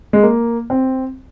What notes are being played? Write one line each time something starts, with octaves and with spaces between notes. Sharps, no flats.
G#3
A#3
C4